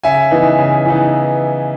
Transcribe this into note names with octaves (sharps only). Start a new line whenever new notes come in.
C#3 E5 G#5
E3 B3 D#4
C#3
E3 B3 D#4